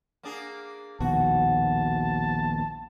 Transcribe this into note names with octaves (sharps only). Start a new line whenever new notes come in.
A#3 D4 G#4
A#1 D#2 B2 F#4 A5